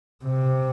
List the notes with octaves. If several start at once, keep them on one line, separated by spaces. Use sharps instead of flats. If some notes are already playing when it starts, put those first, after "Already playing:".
C3